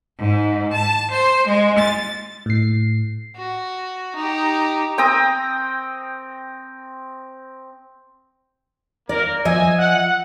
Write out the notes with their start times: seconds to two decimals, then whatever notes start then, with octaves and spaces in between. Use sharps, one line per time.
0.19 G#2
0.72 A5
1.12 C5
1.47 G#3
1.79 A6
2.46 A2 C7
3.36 F#4
4.16 D#4 G4
4.98 C4 G5 A#5 D#6
9.09 A#3 A#4 D5
9.45 F3 D#5 E5 G#5
9.79 F#5